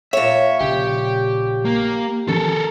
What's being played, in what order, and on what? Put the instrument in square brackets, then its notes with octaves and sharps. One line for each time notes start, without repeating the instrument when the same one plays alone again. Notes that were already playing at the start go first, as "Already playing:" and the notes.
[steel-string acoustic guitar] A#2 C#5 [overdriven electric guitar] E5
[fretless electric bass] A#1 C#3 [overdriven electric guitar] G4
[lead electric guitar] A#3
[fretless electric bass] D#3 F3 C#4 [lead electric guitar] A4 A#4